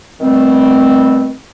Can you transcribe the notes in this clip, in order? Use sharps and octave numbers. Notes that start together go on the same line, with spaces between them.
B2 D#3 G3 A3 C4